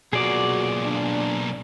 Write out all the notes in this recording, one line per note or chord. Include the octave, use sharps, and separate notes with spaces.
B1 A#2 F#4 G#4 D5 D6
D4